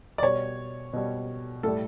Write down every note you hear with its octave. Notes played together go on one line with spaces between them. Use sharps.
D5
B2 G3 C#5
B2 G3
A2 G3 A4